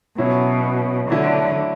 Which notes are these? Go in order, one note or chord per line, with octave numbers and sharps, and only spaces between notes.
B2 F#3 C#4 E4
D3 F#3 A3 E4